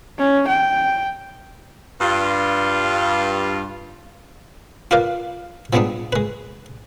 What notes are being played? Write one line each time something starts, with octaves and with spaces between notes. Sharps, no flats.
C#4
G5
G2 F4
F4 A#4 B4 D5 F5
F3 G3 G#3 B3 D4 D#4
G#3 B4